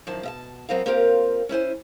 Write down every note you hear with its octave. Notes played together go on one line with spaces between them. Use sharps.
F#2 D#3 F3 A5
B2 E5 A5
F#3 B3 C4 A#4 F5
A#3 C4 F4 G4 A#4
C#4 E4 C5 G#5